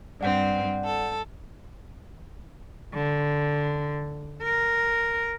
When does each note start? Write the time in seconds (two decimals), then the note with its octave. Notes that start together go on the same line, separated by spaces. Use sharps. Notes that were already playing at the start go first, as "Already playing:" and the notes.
0.21 G2 C4 D5 F#5 G6
0.84 A4
2.94 D3
4.42 A#4